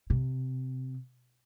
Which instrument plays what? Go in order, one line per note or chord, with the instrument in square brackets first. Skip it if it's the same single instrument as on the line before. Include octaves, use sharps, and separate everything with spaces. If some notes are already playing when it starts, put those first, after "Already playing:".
[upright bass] C3